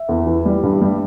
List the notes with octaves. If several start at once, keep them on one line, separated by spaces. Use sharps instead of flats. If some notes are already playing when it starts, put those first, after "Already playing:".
Already playing: E5
E2
E3
G3
G2
G3